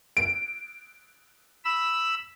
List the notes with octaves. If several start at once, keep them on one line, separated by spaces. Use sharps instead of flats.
D7
B5 E6